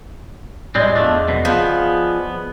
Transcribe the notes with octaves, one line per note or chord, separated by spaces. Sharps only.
A2 G3 G#3 C4 D5 D#5
E2 F3 A3 D4
F#2 B2
F3 B3 G#4